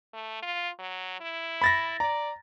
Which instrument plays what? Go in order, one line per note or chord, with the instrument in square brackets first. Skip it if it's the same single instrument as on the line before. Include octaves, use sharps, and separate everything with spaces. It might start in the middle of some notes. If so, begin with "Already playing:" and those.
[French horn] A3
F4
F#3
E4
[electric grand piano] B5 A6 A#6
[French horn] D5 [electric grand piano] A#5